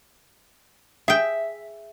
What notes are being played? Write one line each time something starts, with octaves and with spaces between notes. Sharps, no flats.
G#4 E5 G5